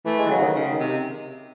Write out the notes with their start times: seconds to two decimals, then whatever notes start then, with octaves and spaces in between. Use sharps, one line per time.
0.05 E3 A3
0.18 G#3
0.26 E3
0.30 C#3 F#3
0.42 D#3
0.55 C#3
0.72 D#3
0.80 C3